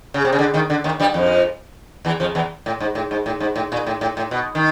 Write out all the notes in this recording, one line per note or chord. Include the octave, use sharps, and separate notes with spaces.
C#3
C3
C#3
D3
D#2 D#3
D3
D#2 D#3
G2 G3
F2 F3
E2 E3
F2 F3
E2 E3
A2
G#2
A2
G#2
A2
G#2
A2
A#2
A2
A2
A2
B2
D#3